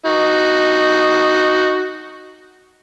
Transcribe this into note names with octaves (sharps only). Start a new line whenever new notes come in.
D#4 F#4